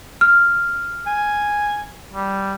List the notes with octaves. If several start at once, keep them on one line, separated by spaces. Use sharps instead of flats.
F6
G#5
G3